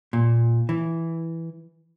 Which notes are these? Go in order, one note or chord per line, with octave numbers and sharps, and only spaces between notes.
A#2
E3